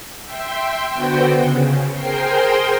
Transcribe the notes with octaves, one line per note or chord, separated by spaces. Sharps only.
E5 G5 C6
D3 B3 F#4 C5 G5
C#3
G#4 A#4 C5 G5 C6